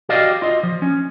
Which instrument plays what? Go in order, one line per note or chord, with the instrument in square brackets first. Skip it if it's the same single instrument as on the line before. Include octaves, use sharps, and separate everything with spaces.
[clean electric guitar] F#4 G4 D5 D#5 F5
F4 D#5
F3
C#4